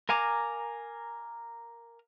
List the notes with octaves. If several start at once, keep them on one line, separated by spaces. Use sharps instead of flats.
A#4 F5 G#5 A#5 D6